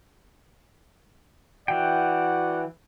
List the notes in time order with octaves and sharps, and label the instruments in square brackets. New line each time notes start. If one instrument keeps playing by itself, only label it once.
[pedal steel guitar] E3 G5 [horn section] F#4 D5 F#5